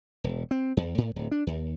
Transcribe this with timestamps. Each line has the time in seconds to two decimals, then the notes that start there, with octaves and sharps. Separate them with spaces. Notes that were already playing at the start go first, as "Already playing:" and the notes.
0.24 E1
0.51 C4
0.77 E2
0.98 A2
1.16 D1
1.32 D4
1.47 D#2